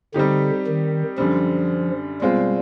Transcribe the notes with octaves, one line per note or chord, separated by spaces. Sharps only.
D3 G3 C4 D#4 G4
D#3
F#2 D3 F3 G3
B2 G3 G#3 C4 F4